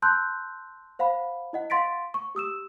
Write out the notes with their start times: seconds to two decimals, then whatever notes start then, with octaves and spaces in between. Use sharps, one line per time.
0.02 A5 C6 E6 F#6 G6
0.99 C5 F5 F#5 B5
1.53 E4 D#5 F#5
1.70 F5 F#5 C6 A6 B6 D7
2.14 C#6
2.35 G4 D#6 E6 E7